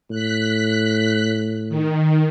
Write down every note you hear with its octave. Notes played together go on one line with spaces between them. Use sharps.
A2 F#6 B6
D#3